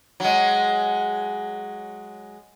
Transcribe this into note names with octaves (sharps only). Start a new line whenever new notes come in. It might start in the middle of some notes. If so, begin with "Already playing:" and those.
F#3 G#3